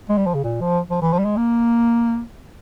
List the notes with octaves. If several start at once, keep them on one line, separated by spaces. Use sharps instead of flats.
G#3
G3
F3
C#3
A#2
F3
F3
E3
F3
G3
G#3
A#3